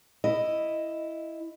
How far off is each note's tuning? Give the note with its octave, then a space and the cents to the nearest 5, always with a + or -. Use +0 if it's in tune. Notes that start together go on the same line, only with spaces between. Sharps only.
E4 +5 D#5 +0